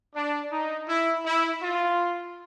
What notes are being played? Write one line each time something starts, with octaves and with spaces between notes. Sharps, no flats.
D4
D#4
E4
E4
F4